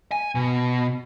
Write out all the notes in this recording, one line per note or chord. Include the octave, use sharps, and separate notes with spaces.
G#5
B2